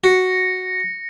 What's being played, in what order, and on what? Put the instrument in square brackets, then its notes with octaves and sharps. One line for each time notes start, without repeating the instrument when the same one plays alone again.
[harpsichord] F#4 [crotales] A#6 C#7